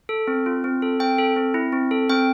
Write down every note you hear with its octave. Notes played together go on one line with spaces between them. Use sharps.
A4
C4
F4
C4
A4
C4 G5
A4
C4
E4
C4
A4
C4 G5